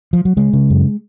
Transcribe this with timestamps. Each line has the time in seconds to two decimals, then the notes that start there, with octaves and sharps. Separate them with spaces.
0.13 F3
0.25 F#3
0.37 C#3 G#3
0.53 C#3
0.70 F#2